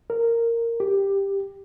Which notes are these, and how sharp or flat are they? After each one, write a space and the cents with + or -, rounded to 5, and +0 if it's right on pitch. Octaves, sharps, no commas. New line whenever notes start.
A#4 -10
G4 +10